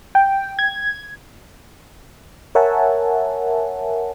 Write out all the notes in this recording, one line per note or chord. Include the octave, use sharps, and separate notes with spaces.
G5
G#6
A#4 C#5 E5 F#5 G#5 A5